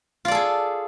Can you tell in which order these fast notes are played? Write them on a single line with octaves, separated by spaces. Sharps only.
F4 D5 A4 G#4